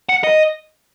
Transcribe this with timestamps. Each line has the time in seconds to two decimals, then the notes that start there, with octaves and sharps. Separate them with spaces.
0.09 F#5
0.24 D#5